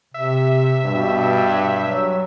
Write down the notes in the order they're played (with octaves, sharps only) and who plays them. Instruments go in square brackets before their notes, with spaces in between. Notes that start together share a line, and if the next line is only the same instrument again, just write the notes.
[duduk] C3 [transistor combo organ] E5
[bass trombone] G2 [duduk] B2
[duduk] F#3